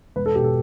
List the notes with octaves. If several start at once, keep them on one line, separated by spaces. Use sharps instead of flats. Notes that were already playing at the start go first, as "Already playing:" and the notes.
E1 B4
A4
B2 G4
A4